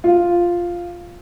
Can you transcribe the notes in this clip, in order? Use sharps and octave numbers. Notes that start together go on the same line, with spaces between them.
F4